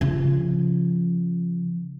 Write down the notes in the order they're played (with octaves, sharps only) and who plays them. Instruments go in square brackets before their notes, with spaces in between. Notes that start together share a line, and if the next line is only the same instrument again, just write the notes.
[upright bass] C#3 F3